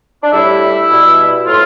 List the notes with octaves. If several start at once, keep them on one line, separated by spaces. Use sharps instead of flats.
D4
A2 G3 E4
B2 G3
A2 F3 F4